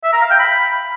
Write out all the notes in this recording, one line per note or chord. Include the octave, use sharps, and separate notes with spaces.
E5
A#5
F5
G5
B5